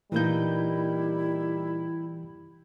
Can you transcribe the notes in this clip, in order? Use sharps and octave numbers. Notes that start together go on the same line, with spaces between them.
A#2 E3 G3 A#3 D#4 E4 G6